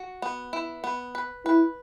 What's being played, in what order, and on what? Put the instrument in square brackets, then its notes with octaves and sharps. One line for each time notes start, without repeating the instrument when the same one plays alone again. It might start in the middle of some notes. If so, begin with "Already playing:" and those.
Already playing: [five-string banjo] F#4
B3
E4
B3
B4
[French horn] E4 [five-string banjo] B4